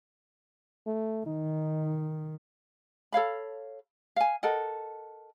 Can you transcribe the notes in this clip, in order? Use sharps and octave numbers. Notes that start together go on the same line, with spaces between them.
A3
D#3 D#4
A4 C#5 F5 B5
F5 G#5
A4 A#4 D#5 F#5